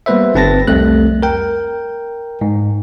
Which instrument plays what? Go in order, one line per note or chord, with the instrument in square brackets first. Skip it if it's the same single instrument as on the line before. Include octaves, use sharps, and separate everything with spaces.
[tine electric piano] G3 A#3 B3 B4 C5 E5
G1 C4 B4 A5 A6 A#6
C2 F2 G3 A3 C4 F#6
A#4 G5
G#2